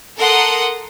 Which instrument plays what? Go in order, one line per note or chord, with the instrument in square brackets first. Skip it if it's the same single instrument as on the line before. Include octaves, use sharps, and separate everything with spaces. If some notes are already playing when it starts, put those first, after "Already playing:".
[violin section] A4 A#4 F#5 C6 D#6